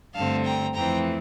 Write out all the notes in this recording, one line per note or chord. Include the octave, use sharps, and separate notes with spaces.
G2 D3 A3 C4 F5 A5
G5 A#5
F2 E3 A3 C4 G5 A#5